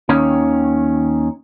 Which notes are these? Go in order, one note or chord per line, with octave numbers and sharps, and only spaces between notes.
D#2 D#3 C#4